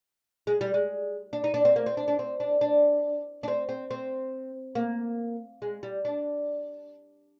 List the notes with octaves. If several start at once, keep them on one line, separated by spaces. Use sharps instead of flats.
G#3
G3
G#3
D4
D#4
D4
C4
A#3
C4
D4
D4
C4
D4
D4
D4
C4
C4
C4
A#3
G#3
G3
D4